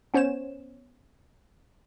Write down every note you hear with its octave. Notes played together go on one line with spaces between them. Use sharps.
B3 C#4 C5 C#5 E7